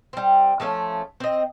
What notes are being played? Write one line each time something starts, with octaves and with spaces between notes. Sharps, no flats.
G3 C4
F3 A3 C4 C#4
C4 D#5